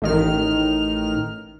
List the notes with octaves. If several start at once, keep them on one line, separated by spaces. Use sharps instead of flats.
A1 D#3 F6